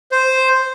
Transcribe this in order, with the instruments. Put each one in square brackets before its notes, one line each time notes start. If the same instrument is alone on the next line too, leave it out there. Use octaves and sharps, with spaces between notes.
[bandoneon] C5